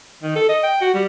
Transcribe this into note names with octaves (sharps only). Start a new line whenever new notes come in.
D#3
A4
D#5
G5
F#4
G3